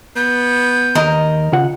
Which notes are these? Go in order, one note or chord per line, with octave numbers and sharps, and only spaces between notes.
B3 G6
D#2 A#4 D#5 A#5
C#3 F4 F#5